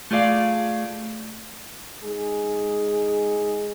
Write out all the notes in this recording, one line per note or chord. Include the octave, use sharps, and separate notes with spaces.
A3 F4 G#4 D5 F5
G#3 D#4 G#4